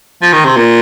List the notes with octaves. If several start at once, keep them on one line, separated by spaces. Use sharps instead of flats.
F3
D#3
C3
A#2